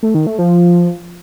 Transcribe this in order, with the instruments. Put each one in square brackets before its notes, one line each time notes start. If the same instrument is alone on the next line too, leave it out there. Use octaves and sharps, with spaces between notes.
[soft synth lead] A3
D#3
A3
F3